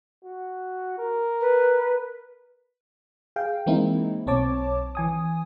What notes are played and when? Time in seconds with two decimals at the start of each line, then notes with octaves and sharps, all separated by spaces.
0.24 F#4
0.98 A#4
1.41 B4
3.36 G#4 F5 G5
3.66 E3 G#3 A#3 C4 D#4 E4
4.27 B1 C4 C#5 A5 D6
4.95 E3 G#5 D#6